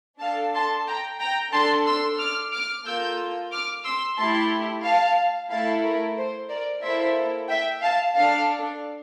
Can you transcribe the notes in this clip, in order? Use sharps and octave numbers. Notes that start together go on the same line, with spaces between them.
D4 A4 F5 A5
A5 C6
G5 A#5
G5 A#5
D4 A4 A5 C6
C6 E6
D6 F6
D6 F6
A#3 F4 A4 E6 G6
D6 F6
C6 E6
A3 E4 G4 A5 C6
F5 A5
A3 E4 A4 F5 A5
A#4
C5
A#4 D5
A#3 E4 A4 C5 E5
E5 G5
F5 A5
D4 A4 F5 A5